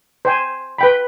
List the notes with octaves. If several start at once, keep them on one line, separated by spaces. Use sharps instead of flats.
C5 G5 G#5
B4 G5 B5